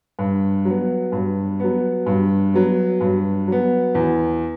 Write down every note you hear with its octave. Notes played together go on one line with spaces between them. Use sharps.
G2
F#3 B3
G2
F#3 B3
G2
F#3 B3
G2
F#3 B3
E2